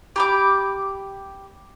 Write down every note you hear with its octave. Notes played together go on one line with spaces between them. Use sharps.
G4 B5 D6